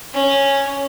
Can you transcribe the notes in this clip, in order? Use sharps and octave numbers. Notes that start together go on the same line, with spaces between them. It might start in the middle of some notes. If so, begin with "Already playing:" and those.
C#4